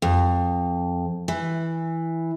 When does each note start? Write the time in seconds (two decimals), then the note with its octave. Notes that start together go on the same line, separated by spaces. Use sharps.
0.02 F2
1.28 E3